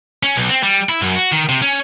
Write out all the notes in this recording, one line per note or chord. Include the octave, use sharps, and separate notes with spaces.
C#4
B1
C4
G3
E4
F#2
F#4
D#3
C3
C#4